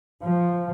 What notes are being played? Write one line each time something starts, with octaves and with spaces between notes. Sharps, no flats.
F3